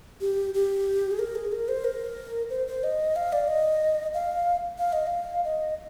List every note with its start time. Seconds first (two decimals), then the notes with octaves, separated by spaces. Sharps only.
0.21 G4
0.54 G4
1.11 G#4
1.19 A#4
1.35 G#4
1.52 A#4
1.68 C5
1.84 A#4
2.50 C5
2.67 C5
2.84 D#5
3.16 F5
3.33 D5
3.48 D#5
4.14 F5
4.78 F5
4.93 D#5
5.07 F5
5.44 D#5